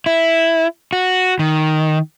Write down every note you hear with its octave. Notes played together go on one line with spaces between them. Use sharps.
E4
F#4
D#3